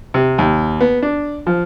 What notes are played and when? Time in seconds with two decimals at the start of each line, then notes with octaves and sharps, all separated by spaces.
0.14 C3
0.38 D#2
0.81 B3
1.03 D4
1.47 F3